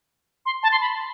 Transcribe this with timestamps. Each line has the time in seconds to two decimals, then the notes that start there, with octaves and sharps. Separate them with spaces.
0.46 C6
0.63 A5
0.72 C6
0.81 B5